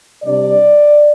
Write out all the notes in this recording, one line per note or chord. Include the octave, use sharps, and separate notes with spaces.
C3 G3 D4 D5